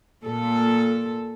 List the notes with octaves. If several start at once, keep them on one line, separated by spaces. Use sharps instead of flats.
A#2 A4